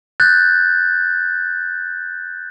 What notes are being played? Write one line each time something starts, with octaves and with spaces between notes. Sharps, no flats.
F#6 G6 A6